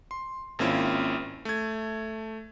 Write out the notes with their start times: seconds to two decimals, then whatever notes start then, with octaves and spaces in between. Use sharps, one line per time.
0.11 C6
0.59 G#1 A#3 C4 C#4 E4 F4
1.45 A3 G#6